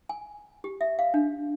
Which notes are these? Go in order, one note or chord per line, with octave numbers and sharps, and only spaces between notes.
G#5
G4
E5
F5
D4